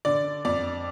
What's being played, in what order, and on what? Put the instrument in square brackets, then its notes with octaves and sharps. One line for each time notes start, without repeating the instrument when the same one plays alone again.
[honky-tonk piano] D3 D5
F2 D5